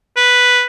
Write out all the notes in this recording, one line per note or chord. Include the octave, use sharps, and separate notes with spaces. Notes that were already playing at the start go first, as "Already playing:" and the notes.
B4